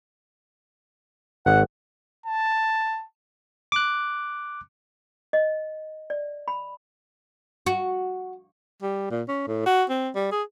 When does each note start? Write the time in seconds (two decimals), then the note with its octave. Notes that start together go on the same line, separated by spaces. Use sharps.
1.46 G#1 F#5
2.26 A5
3.72 D6 F#6
5.33 D#5
6.10 D5
6.48 B5
7.66 F#4
8.83 G3
9.11 A#2
9.28 C#4
9.47 A2
9.66 F#4
9.90 C4
10.15 G3
10.32 G#4